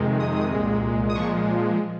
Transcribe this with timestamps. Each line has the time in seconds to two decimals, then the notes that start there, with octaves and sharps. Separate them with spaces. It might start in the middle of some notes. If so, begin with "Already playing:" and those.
Already playing: F2 C3 D#3 G#3
0.20 D#6
0.52 C2 A#2 G#3
1.10 D#6
1.15 A#2 F3 G#3 C#6